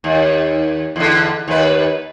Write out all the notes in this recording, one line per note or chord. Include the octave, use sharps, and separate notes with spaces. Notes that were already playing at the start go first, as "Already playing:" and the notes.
D#2
E2 D3
D#2 B4